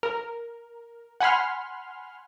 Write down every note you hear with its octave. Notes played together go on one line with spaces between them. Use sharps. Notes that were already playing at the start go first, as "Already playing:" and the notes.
A#4
F#5 G#5 B5 C6 F6